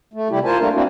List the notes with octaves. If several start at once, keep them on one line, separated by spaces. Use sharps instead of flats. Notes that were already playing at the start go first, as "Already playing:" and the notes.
A3
C3 G3 A3 E4 G4
F4 A#4 C5 G#5 A5
G3 A3 A#3 D4 A#4
A#3 C4 D4 E4 F#4